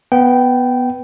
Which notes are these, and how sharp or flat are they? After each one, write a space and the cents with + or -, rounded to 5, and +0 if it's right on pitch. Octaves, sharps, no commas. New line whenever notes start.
B3 +0 G5 -15